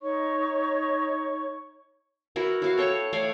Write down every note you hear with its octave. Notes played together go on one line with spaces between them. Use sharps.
D#4 C#5 C#6
E4 F#4 A#4 B4
E4 F#4 F5
A4 C#5 G5 C#6
A3 C#5 D5 F5